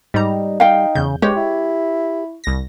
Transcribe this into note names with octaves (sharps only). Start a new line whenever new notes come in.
G#2 G3 D#4 A#5
D#4 F5 G5
E2 C#3 G6
G2 G#3 G4 C#5
E4
C2 A#6